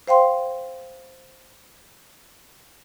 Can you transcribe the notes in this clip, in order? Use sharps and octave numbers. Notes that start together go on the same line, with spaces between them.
C5 F5 G5 C6